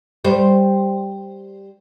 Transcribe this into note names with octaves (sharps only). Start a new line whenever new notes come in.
G3 C5